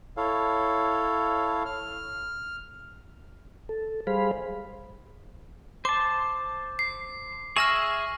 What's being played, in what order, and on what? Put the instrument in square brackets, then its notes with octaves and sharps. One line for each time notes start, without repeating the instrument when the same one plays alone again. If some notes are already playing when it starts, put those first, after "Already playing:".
[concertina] E4 A4 C#5 F5
F6
[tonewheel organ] A4
G3 G#4 C5 F5 B5
[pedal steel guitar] C5 A5 [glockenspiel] D6
[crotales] C7
[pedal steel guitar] G#4 E5 G#5 [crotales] C#6 [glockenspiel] F6 A#6 F#7